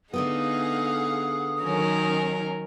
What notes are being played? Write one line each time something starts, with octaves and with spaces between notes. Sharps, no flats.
D3 A3 B3 D#4 G#4 F5 F#5 D#6
D#3 F#3 C#4 D#4 A#4